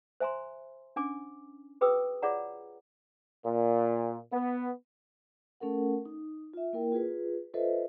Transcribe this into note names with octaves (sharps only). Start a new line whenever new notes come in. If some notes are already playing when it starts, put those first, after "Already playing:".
C5 E5 G#5 A#5 C6
C#4 D4 G#5 D6
F#4 G#4 B4 G5 D#6 E6
F4 G#4 C#5 D5 F#5 A#5
A#2
B3
A3 C#4 A4 A#4 F#5
D#4
F4 E5
A#3 E4 A#4 G5
F4 G#4 B4
F4 A4 B4 C5 D#5 E5